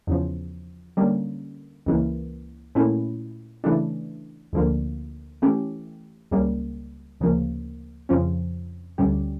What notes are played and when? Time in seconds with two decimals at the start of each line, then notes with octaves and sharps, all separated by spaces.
0.07 E2 C#3 F3
0.97 D3 G3 A#3 C#4
1.86 C#2 C#3 E3 A#3
2.75 A#2 A3 C#4 E4
3.64 C#3 E3 A3 D4
4.53 D2 D3 F3 A#3
5.42 E3 A3 C#4 G4
6.31 C#2 C#3 G3 A#3
7.20 D2 C#3 F3 A#3
8.09 F2 C#3 F3 C#4
8.98 D2 D3 G3 C#4 G4